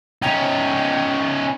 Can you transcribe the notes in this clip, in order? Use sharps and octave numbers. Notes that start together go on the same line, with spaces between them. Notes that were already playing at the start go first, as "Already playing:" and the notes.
C#4 D#4 G5